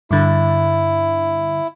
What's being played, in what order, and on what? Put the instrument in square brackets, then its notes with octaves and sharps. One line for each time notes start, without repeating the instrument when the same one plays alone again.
[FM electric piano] G2 D3 [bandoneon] E4